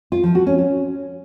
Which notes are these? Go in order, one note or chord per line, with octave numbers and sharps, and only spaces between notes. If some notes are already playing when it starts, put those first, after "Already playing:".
F4
F3
F#4
C#4
C#4